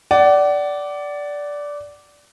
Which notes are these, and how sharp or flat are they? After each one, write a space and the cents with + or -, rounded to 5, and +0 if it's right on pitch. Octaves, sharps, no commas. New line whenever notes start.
D5 -10 F#5 +30